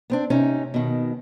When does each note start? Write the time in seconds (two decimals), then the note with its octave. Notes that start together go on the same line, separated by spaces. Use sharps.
0.10 B3 C4 D4
0.30 C3 C#4 D#4
0.74 B2 D#3